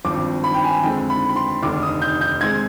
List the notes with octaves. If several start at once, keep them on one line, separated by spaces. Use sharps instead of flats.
G#1 G2 F3 C4 D6
B5
G5
G#5
F2 D3 G#3 C4 G5
B5
B5
C6
F1 D#2 D3 D6
D#6
G6
G6
D#3 G#3 C4 G#6